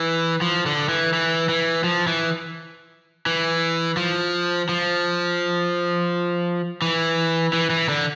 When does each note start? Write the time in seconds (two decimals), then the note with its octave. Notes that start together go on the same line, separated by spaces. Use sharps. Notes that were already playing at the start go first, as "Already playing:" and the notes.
Already playing: E3
0.41 F3
0.66 D3
0.89 E3
1.13 E3
1.49 E3
1.84 F3
2.07 E3
3.26 E3
3.97 F3
4.69 F3
6.82 E3
7.53 E3
7.70 E3
7.89 D3